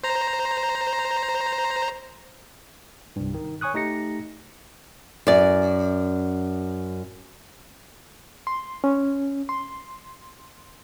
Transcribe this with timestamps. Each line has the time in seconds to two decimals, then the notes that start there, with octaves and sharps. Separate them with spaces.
0.03 C5 A#5
3.16 C2 G2
3.34 D#3
3.61 C#5 G#5 C#6 D#6 F#6
3.74 A3 D#4 G4 A#6 C#7
5.27 F#2 D5
8.47 C6
8.84 C#4
9.49 C6